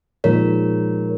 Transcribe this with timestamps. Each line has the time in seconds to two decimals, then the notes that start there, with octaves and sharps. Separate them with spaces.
0.24 A#2 F3 G#3 D#4 G#4 A#4 C#5